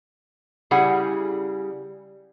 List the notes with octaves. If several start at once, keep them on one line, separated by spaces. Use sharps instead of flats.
C#3 G3 E4 G#4 F#5 G#5